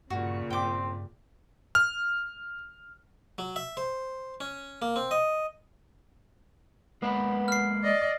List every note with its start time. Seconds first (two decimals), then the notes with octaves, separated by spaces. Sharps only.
0.10 G2 A#2 C#3 F#4 C#6
0.50 G2 C4 G5 D6
1.75 F6
3.38 F#3
3.56 E5
3.77 C5
4.41 C#4
4.82 A#3
4.96 C4
5.11 D#5
7.02 G#3 A#3 B3 B4
7.48 F6 C7
7.83 D5 D#5